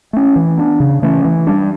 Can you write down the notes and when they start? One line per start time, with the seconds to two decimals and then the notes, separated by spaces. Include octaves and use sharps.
0.13 A3 C#4
0.36 E3
0.58 B3 D4
0.80 C#3
1.02 E3 A3 C#4
1.25 E3
1.47 G3 D4